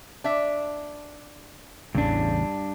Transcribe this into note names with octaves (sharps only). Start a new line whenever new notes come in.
D4 E5
A1 E2 G2 C#3 D4